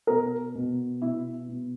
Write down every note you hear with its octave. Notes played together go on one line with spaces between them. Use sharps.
B2 A#4
B2
B2 E4
B2